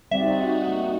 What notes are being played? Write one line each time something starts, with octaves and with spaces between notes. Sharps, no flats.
G3 C4 D#4 F#4 D5 E5
A#3